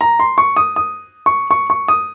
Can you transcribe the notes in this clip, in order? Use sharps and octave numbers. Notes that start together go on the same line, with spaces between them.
A#5
C6
C#6
D#6
D#6
C#6
C#6
C#6
D#6